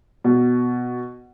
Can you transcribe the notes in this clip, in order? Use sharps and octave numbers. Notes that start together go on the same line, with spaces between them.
B2